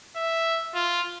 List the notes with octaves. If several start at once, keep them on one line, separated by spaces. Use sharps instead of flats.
E5
F4